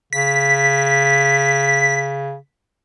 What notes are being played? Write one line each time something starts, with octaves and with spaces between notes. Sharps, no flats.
C#3 B6